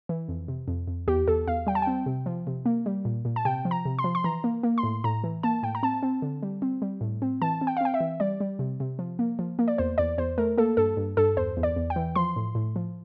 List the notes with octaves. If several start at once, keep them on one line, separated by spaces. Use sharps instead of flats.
E3
F2
C3
F2
F2
E2 G4
E2 A4
E2 F5
G3 G5
A5
C4 G5
C3
F3
C3
A#3
G3
A#2
A#2
A5
C3 G5
F3
A#5
C3
C6
F3
C6
E3 A#5
A#3
A#3
C6
A2
A2 A#5
E3
A#3 A5
A2 G5
A#5
C4 A5
C4
D3
G3
C4
G3
A2
C4
E3 A5
C4
G5
F5
C4 G5
E5
E3
G3 D5
G3
C3
C3
F3
A#3
F3
A#3
D5
E2 C5
E2 D5
E2 C5
A3 A#4
A#3 A4
G2 A4
G2
G2 A4
E2 C5
E2
D5
E2
G5
E3
F3 C6
A2
A2
F3